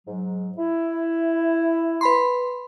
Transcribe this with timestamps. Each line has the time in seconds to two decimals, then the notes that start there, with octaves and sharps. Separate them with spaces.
0.07 G#2 F#3
0.58 E4
2.01 B4 B5 C6